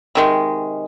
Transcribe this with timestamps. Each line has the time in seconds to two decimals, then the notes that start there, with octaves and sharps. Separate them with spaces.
0.15 C3 D#3 G#3